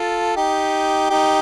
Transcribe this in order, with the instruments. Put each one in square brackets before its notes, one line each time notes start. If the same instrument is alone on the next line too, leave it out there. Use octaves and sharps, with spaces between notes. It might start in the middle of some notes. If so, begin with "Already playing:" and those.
Already playing: [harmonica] F4 A4
D#4 G4
D#4 G4